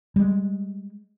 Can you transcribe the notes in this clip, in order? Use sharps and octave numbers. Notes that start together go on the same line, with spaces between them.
G3 G#3